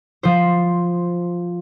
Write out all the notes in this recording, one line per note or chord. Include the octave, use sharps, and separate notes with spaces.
F3 C5